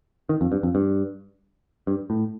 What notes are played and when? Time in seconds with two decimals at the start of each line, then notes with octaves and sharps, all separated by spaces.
0.29 D#3
0.41 F2
0.52 G2
0.63 F2
0.75 G2
1.87 G2
2.10 A2